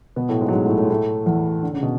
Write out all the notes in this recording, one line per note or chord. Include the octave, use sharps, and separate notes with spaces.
B2 B3
A2 A3
G#2 G#3
F#3
G#2 G#3
A2 A3
A2 A3
G#3
A2 A3
E2 E3
D3
C#3
B2